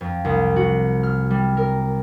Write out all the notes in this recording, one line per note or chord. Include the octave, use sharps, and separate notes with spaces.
F2
C2
F#4
F6
G3
A#4